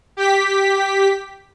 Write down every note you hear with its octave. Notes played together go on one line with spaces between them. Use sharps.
G4 B6